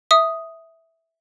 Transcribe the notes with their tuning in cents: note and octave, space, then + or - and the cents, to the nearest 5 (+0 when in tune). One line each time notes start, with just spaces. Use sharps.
E5 -5 D#6 +0